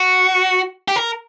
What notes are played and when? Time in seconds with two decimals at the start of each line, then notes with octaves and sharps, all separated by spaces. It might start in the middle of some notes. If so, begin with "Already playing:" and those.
Already playing: F#4
0.88 G4
0.96 A#4